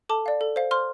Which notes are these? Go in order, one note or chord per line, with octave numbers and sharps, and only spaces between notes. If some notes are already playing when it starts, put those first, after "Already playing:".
A4 A5 D6
D5 F5
A4
C5 F5
C5 C6 F6